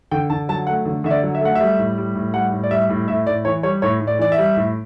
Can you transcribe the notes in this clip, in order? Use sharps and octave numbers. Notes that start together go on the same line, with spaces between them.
D3 G5
D3 A5
F#3 A5
A3 F#5
D3
D3 E5
D5
F#3
E5
A3 F#5
G3 E5
A2
G3
A2
G3 F#5
A2
D5
G3 E5
A2
A2 E5
A2 D5
E3 C#5
G3 C#5
A2 C#5
A2
D5
E3 D5
E5
G3
A2